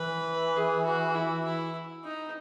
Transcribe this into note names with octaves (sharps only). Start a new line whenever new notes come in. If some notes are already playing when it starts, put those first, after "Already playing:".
Already playing: E3 B4
G#4
F#4
E4
E4
D#4